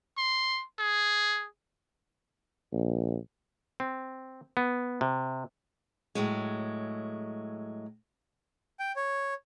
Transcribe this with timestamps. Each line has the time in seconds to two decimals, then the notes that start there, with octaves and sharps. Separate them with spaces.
0.18 C6
0.79 G#4
2.72 A#1
3.80 C4
4.57 B3
5.01 C3
6.15 A2 F#3 G#3
8.80 G5
8.96 C#5